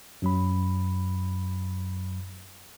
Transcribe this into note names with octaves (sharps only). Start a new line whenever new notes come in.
F#2 F#3 B5